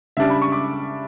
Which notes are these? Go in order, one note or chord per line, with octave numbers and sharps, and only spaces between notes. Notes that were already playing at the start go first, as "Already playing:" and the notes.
C#3 G3 D4 E5
B5
C#6
D6